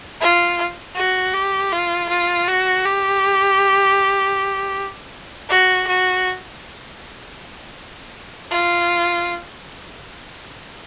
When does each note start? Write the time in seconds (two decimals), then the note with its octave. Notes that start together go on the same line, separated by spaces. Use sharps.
0.21 F4
0.96 F#4
1.34 G4
1.72 F4
2.09 F4
2.48 F#4
2.85 G4
5.49 F#4
5.87 F#4
8.51 F4